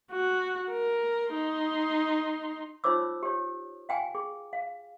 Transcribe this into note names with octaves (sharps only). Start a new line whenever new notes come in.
F#4
A#4
D#4 C6
D#4 F4 C5 C#5 D6 E6
G4 C#5
F5 G5 G#5
G#4
F5